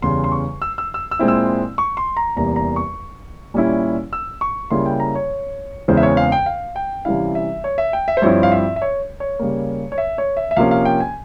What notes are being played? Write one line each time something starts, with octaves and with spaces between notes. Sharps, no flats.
E2 C#3 G3 C6
C6
C#6
E6
E6
E6
E6
A#2 G#3 C4 E4
E6
C#6
C6
A#5
E2 C3 G3 A#3 A#5
A#5
C#6
A#2 G3 C#4 E4
E6
C#6
C#3 G3 A#3 E4 C6
G5
A#5
C#5
E2 C#3 E3 G#3 C4 C5
E5
C#5
F5
G5
F5
G5
C3 E3 G3 C#4 E4 F5
E5
C#5
E5
G5
E5
C5
G2 F3 C4 E4 C#5
F5
E5
E5
C#5
C#5
C#3 G3 A#3
C#5
E5
C#5
E5
E5
C3 F3 A#3 C#4 F5
F5
G5
G#5